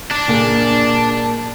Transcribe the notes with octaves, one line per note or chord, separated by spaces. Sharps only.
D4
A#2 A#3 G#4